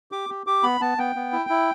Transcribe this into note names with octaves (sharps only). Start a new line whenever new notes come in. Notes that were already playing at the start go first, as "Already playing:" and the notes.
G4 D6
G4
G4 D6
B3 B5
B3 A5
B3 G5
B3
E4
E4